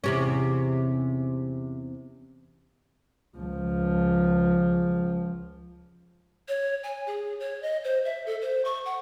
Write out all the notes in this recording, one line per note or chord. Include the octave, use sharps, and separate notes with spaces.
E2 C3 C#4
C#2 F3
C#5
G#5
G#4
C#5
D#5
C5
E5
A4
C5
C#6
F#5